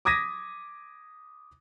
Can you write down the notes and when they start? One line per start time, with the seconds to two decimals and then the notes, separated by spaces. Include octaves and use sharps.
0.05 D6 D#6 G#6 A#6 B6 D#7